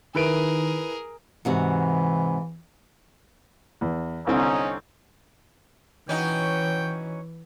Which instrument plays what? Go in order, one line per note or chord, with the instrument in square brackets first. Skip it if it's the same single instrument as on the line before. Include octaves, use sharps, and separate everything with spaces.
[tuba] D#3 [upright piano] E4 B4 D7 [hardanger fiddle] G#4 A#4
[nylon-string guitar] G#2 C3 F#4 [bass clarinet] E3
[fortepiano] E2
[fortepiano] C2 D3 C4 [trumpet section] C#4 D#4
[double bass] E3 [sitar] C#4 D#4 F#4 [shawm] G5